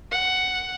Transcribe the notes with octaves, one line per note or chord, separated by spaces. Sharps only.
F#5